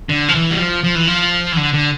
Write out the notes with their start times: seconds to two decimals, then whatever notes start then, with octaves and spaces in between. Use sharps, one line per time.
0.09 D3
0.28 F3
0.34 E3
0.51 G3
0.59 F3
0.84 F3
0.95 E3
1.07 F3
1.52 E3
1.57 D3
1.73 D3